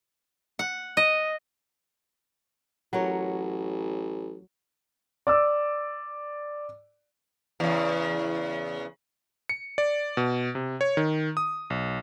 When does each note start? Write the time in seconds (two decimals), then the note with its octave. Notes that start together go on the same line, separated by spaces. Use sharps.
0.59 F#5
0.97 D#5
2.93 A1 F#3 A#4 C#5
5.27 D5 D6 E6
7.60 E2 C#3
9.49 C#7
9.78 D5
10.17 B2
10.55 C3
10.81 C#5
10.97 D#3
11.37 D#6
11.70 B1